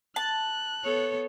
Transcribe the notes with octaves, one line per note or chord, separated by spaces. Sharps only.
A5 F#6
B3 A4 C#5